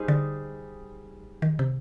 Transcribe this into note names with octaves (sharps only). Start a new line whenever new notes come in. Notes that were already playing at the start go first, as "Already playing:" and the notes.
Already playing: G3 D#4 G#4 C5
D3
D#3
C3